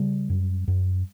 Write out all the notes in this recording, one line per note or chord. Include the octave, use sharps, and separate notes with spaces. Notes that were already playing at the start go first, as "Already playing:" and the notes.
Already playing: C#3 G3
F#2
F#2